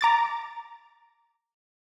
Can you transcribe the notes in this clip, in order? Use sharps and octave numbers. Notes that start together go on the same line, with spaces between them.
A#5 D6 A6